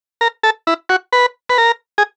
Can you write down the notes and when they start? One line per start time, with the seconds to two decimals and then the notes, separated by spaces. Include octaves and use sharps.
0.21 A#4
0.43 A4
0.67 E4
0.89 F#4
1.13 B4
1.50 B4
1.58 A#4
1.98 G#4